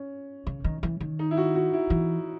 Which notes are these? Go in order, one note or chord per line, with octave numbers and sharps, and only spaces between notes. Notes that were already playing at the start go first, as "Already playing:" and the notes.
Already playing: C#4
C#3
D#3
E3
D#3
D#4
E4
F#4
F#4
E4
E3